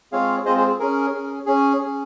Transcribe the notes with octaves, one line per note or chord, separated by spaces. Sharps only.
G#3 C4 F4 G#4 C#5 F5
G#3 C4 F4 G#4 C5 D#5
G#4 C5
G#4
C#4 G#4 A#4
C#4 G#4
C#4 G#4
C#4 G#4